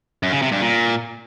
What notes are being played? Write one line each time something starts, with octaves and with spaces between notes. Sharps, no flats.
F#2
C#3
C3
G2
A#2